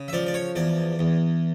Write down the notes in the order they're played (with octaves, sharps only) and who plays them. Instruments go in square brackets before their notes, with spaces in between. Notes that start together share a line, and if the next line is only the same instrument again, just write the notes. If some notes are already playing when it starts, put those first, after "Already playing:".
Already playing: [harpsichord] C#3
E5
F3 D5
D5
C#5
E2 D5
E2